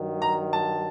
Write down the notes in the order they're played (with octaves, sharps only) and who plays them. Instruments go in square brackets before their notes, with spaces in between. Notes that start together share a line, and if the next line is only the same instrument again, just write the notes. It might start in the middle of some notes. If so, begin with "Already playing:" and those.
Already playing: [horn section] G2 D#3 F#3
[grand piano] A#5
A5